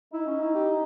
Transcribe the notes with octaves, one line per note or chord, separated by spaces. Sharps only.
D#4 E4
C#4
E4
G4